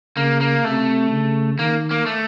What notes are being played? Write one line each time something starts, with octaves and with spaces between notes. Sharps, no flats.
C#3 A#3
A#3
C3 A3
C#3
D#3 A#3
A#3
A3